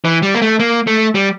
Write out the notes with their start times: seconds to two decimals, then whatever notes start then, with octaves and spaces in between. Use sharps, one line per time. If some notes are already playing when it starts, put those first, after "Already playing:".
0.05 E3
0.22 G3
0.35 A#3
0.42 A3
0.60 A#3
0.87 A3
1.15 G3